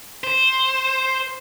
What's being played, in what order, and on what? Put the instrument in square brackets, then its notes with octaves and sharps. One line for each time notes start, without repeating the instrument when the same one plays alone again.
[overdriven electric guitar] C5